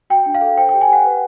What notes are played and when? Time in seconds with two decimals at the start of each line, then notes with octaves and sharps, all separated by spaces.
0.10 F#4 G5
0.26 D4
0.35 F5
0.41 A4
0.57 C5 G5
0.69 G5
0.74 G4
0.81 G#5
0.88 G4 F#5
1.05 B4